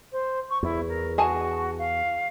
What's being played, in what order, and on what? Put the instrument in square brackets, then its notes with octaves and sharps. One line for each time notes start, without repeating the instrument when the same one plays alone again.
[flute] C5
C#6
[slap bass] E2 [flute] E4
[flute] A#4
[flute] F#4 [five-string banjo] G#4 G#5 A5
[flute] F5